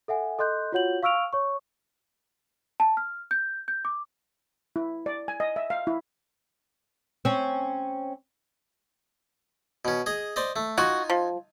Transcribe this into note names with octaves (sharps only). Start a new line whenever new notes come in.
A4 E5 F#5 G#5
A4 D#5 C6 F#6 G6
F4 F#4 C#5 F#5 G6 F#7
F5 C#6 E6 F6 D7 F7
C#5 C#6
A5
F6
G6
G6
D6
E4
D5
G#5
D#5
E5
F5
E4
C4 C#4
B2 C#4
G#4 D#5
C5 D5 D#5
A3
D#4 F4 F#4 G#5
F3